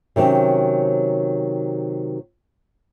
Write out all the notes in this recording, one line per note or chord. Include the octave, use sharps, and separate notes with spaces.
C3 D#3 F#3 C4 C#4